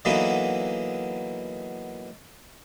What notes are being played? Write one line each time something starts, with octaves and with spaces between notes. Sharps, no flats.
D3 E3 F#3 A#3 B3 D#4